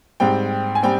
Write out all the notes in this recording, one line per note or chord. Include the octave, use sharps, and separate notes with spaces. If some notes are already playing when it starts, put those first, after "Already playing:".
G#2 G3 C4 G5
G#5
G3 C4 G5